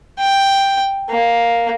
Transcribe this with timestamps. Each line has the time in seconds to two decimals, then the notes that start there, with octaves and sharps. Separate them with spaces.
0.20 G5
1.10 A#3